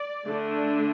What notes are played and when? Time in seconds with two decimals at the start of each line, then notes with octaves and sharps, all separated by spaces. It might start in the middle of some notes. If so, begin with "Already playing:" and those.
Already playing: D5
0.25 D3 A3 D4